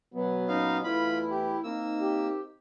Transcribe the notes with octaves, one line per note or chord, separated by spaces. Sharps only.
F#2 B2 F#3 B3
A#2 C#4 D#4 F5
E2 A3 E4 F4 B4 B5
G4
A#3 C4 D#4 E6
G4